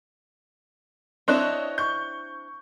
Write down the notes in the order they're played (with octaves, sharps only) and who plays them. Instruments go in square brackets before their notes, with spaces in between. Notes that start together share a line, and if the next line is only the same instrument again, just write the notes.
[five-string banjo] C4 D4 E4 [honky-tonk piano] C#5 D#5 F#6
[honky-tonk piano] C#6 G6